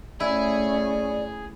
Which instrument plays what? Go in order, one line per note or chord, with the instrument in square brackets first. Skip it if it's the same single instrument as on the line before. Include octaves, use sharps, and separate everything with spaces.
[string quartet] A3 C#4 [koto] E4 [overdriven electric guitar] G#4 [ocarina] D5